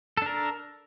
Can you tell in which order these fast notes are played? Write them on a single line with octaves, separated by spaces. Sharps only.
A4 D4 A#4